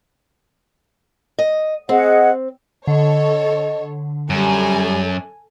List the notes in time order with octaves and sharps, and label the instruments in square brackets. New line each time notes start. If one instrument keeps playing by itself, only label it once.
[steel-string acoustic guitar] D#5
[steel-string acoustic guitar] C4 [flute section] G#4 D#5 F#5
[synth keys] D3 [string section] A4 C#5 [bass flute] D#5
[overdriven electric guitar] F#2 [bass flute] G3 [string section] A4 G#5